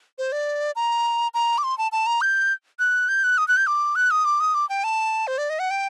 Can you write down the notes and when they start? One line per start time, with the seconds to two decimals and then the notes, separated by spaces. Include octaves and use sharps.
0.18 C5
0.32 D5
0.76 A#5
1.34 A#5
1.58 D6
1.64 C6
1.78 A5
1.92 A5
2.06 A#5
2.21 G6
2.79 F#6
3.09 G6
3.24 F#6
3.38 D#6
3.48 F#6
3.57 G6
3.67 D6
3.96 F#6
4.11 D#6
4.25 D6
4.40 D#6
4.54 D6
4.69 G5
4.84 A5
5.27 C5
5.38 D5
5.50 D#5
5.59 F#5
5.71 G5